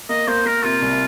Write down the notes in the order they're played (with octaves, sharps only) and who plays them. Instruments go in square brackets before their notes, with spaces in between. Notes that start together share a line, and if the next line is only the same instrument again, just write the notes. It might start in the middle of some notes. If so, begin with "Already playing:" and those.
[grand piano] A#3 [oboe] D#5
[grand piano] A#3 [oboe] C5
[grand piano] A#3 [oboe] A#4
[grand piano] C3 [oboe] F4
[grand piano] C2